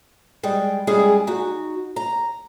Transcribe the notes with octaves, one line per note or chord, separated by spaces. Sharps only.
G3 G#3 G#4 G5
G3 G#3 C#4 E4 G#4
D#4 F#4
A#5